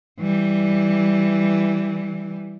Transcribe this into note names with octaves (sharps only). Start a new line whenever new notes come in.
E3 G3